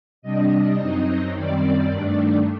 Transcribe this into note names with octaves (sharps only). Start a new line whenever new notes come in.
C3 G3 D4 D#5
F#2 F#3 C4 D#4
F#2 D#3 G3 C4 D5
G2 D#3 A3 D4